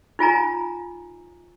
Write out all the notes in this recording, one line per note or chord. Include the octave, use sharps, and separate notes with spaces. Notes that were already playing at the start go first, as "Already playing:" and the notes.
D#4 F4 G#5 A#5